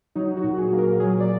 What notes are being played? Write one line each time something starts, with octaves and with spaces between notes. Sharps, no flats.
F#3 D#4
F#4
A#2
G#4
A#3
A#4
F#3 G#4
D5